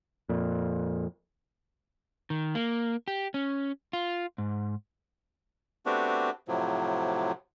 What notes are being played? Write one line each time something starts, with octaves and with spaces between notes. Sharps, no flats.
F2 A#2
D#3
A#3
G4
C#4
F4
G#2
A3 B3 C4 D4 F#4 G4
A2 C3 F3 F#3